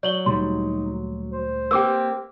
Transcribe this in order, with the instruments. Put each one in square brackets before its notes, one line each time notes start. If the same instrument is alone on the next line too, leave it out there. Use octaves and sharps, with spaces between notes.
[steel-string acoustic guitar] F#3 [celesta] D5 F#7 G7
[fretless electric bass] D2 A#2 G3 [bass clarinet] D#4 [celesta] C6
[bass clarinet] C5
[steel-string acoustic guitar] A#3 C4 G4 [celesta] G5 D6 E6